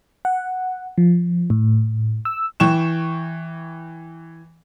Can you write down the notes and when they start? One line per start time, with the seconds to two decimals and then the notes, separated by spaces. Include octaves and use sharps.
0.25 F#5
0.98 F3
1.50 A2
2.25 E6
2.60 E3 G5 C#6 E7